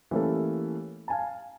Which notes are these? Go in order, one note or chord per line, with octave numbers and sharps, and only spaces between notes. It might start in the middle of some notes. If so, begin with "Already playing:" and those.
E3 A3 A#3 C#4 G4 A4
F5 G#5 A5